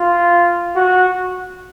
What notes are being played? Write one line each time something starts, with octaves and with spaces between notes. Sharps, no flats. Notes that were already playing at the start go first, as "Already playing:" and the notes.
Already playing: F4
F#4